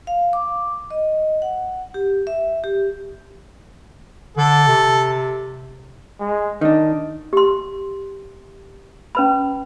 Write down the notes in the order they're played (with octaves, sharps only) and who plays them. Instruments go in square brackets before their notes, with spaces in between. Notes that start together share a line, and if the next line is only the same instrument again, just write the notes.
[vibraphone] F5
D6
D#5
F#5
G4
E5
G4
[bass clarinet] D3 [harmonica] A4
[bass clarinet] C3
[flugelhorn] G#3
[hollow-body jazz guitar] D#3 D4 [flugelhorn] D#5
[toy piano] G4 C6
C#4 B4 B5